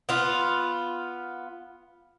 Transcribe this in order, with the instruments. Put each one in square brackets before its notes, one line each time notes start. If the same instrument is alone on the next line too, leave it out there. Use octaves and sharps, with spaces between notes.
[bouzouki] B3 F4